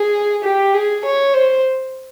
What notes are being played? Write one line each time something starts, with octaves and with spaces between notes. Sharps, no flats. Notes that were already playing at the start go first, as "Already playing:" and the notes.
Already playing: G#4
G4
G#4
C#5
C5